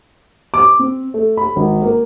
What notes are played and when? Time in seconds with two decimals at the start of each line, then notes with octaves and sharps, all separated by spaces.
0.54 D6
0.79 C4
1.14 A3
1.37 B5
1.56 G#1
1.82 A#3